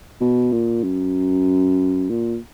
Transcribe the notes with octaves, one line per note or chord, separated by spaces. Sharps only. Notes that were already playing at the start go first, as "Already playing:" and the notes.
B2
A#2
F#2
A#2